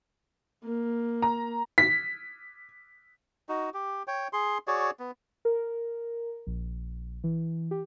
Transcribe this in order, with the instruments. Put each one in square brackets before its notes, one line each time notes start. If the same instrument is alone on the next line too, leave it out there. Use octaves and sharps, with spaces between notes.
[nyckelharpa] A#3
[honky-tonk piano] A#5
B6
[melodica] D#4 F#4
G4
C#5 G5
G#4 C6
F#4 G#4 C#5 D5
B3
[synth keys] A#4
A#1
E3
G4